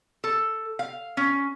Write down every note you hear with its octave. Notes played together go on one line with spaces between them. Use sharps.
A4
F5
C#4